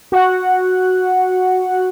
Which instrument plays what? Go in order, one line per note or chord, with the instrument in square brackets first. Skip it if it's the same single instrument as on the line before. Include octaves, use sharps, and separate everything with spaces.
[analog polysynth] F#4 F#5